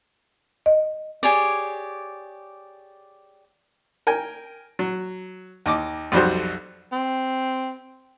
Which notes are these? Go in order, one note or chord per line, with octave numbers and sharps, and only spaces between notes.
D#5
G4 G#4 C#5 D5
A#4 G5 G#5
F#3
D#2 D#5 D6
B1 F2 G3 F#4 C5
C4